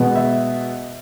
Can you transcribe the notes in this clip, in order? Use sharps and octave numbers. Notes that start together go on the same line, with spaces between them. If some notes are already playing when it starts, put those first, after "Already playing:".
Already playing: B2 G#3 B3
E5